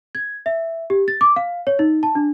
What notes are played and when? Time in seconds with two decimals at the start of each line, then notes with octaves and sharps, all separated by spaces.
0.15 G#6
0.46 E5
0.90 G4
1.08 A6
1.21 D6
1.36 F5
1.67 C#5
1.79 D#4
2.03 A5
2.15 D4